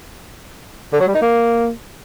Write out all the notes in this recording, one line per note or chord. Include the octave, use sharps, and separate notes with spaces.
D3
F#3
G3
D#4
A#3